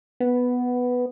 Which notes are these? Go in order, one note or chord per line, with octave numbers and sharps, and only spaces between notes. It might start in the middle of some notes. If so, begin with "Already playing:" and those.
B3